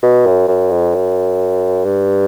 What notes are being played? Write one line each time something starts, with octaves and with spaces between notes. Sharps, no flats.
B2
F#2
F#2
F2
F#2
G2